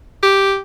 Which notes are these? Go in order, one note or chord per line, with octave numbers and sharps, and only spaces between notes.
G4